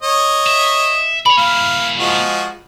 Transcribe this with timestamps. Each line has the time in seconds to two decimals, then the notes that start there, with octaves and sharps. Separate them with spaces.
0.02 C#5 D#5
0.47 E5
1.26 C#5 D5 B5
1.38 A#3 E4 F5
1.99 F3 G#3 F#4